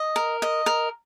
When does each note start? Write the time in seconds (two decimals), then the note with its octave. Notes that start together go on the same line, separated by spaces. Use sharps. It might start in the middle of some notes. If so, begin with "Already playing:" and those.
Already playing: D#5
0.16 A#4
0.42 D#5
0.66 A#4